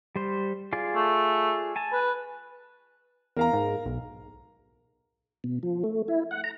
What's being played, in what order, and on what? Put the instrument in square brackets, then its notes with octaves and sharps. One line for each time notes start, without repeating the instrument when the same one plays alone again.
[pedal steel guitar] G3 C5
F4 G#4 D5
[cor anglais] A3
[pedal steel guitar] G#5 A5
[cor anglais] B4
[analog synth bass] E2 [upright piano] A#4 F5 A#5
[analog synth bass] G#2
B1
[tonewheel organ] B2
F3
A3
E4
F#5
A#5